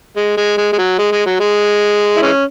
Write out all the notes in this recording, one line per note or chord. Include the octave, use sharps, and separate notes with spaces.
G#3
G#3
G#3
G#3
F#3
G#3
G#3
F#3
G#3
E4
E3 G#3 C#4